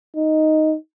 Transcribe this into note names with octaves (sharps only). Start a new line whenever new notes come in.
D#4